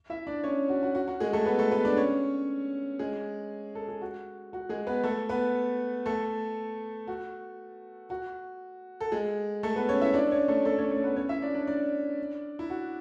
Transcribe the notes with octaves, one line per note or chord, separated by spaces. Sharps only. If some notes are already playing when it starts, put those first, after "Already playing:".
E4 E5
D4 D5
C#4 C#5
F#4
F#4
F#4
F#4
G#3 G#4
A3 A4
B3 B4
A3 A4
B3 B4
D4 D5
C#4 C#5
G#3 G#4
A4
G#4
F#4
F#4
G#3 G#4
B3 B4
A3 A4
B3 B4
A3 A4
F#4
F#4
A4
G#3 G#4
A3 A4
B3 B4
C#4 C#5
E4 E5
D4 D5
C#4 C#5
A3 A4
A3 A4
C#4 C#5
A3 A4
B3 B4
C#4 C#5
E4 E5
D4 D5
D4 D5
D4 D5
E4
F#4